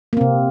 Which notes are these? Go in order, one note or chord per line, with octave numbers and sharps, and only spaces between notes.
C3 A#3 C4